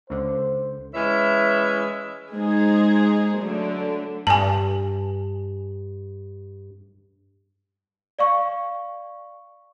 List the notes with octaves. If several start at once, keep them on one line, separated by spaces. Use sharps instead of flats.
C#2 D3 C5
E3 G#3 C#4 E4 E5
G#3 D#4 G#4 C5
D3 F#3 A3
G2 G#5 A5
D5 F5 C#6